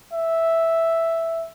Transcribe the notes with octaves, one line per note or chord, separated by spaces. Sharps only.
E5